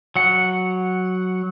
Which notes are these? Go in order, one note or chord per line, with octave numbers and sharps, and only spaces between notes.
F#3 F#5